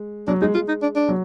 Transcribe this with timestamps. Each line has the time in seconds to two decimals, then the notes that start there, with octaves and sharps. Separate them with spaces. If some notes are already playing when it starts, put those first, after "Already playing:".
Already playing: G#3
0.27 F#3 D4
0.41 G#3 D#4
0.55 G#3 F4
0.68 D#4
0.82 D4
0.95 D4
1.09 F#3